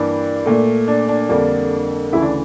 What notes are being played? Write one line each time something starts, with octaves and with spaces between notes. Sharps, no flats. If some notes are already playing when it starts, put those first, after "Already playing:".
Already playing: G2 E3 A#3 D4
A#2 A3
D4
D4
F2 D3 G3 A#3
D2 C#3 E3 E4
D4